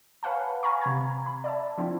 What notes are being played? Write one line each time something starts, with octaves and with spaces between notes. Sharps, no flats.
B4 C#5 F5 F#5 G#5 A5
F5 G#5 A#5 B5 C#6
C3 A#5 G#6
B5
D5 E5 A5
F3 C4 D4 E4